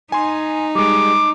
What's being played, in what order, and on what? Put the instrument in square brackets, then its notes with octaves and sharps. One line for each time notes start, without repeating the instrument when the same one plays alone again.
[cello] D#4 [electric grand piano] G#5 C6
[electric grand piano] G3 G#3 [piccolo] D6